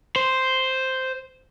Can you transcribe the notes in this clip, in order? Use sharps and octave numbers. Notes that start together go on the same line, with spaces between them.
C5